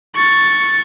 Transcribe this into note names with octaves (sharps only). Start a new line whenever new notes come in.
C#6 A6